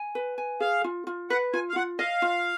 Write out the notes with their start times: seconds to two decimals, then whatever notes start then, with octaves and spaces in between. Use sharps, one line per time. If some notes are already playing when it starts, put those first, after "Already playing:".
Already playing: G#5
0.15 B4
0.38 G#5
0.60 G#4 F5
0.84 F4
1.07 F4
1.30 B4 F#5
1.53 F4 G#5
1.69 F5
1.76 F4 F#5
1.99 D#5 F5
2.22 F4